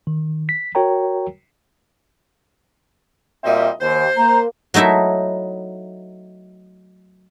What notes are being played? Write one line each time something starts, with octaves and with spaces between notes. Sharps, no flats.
D#3
B6
F#4 A#4 C#5 G5 A#5
A#2 G3 C4 F#4 D#5 E5
D#2 C5
A#3 A#5
F#3 A3 D#4 E4 E5